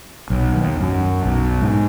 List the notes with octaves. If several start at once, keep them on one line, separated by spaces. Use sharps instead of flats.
B1
D#2
F#2
B1
G#2